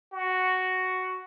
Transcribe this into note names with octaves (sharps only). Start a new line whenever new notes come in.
F#4